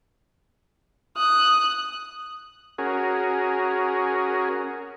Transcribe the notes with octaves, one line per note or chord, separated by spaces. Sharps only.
D#6 F#6
C#4 F#4 G#4 A#4